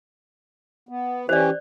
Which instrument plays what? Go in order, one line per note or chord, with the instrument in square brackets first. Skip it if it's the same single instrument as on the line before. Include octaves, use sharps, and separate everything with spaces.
[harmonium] B3
[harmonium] E3 C#4 G4 [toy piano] C5 D5